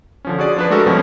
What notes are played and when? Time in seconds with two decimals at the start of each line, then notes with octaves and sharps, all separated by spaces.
0.25 D3 F3 C#4
0.38 F#4 G#4 D5
0.56 F3 D4 B4
0.70 G#3 A3 F#4 A4 A#4
0.86 F2 B2 F3 G3 C#4